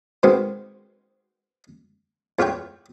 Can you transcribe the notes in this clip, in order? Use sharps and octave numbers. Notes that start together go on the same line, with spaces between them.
B2 D#3 G#3 B3 C4
E2 F4 B4 C#5 G5